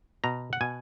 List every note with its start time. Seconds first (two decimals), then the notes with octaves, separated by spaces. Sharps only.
0.24 B2 A#5
0.53 F#5
0.61 B2 G#5